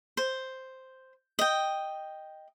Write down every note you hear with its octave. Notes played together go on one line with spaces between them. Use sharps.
C5
D#5 G5